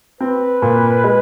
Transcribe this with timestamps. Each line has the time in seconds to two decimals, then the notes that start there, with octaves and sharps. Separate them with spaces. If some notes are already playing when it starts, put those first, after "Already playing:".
0.21 C4 B4
0.62 A#2
1.04 G#3